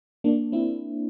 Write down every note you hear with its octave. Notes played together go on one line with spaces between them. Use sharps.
A#3 D4
C4 E4